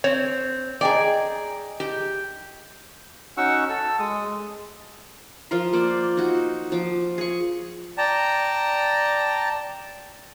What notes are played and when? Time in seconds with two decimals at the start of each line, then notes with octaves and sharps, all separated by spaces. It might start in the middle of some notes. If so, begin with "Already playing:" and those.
0.04 C4 C#5
0.81 G#4 D5 D#5 G5 A#5
1.80 G4
3.37 C#4 D#4 F#4 F#5 C#6 E6
3.69 A4 E6
3.99 G#3 D#6
5.51 F3 F4 A#4 C6
5.73 A#3 C5 D5
6.17 D#4 F#4
6.72 F3 D6
7.18 G#4 C#6
7.98 D5 G5 A5 A#5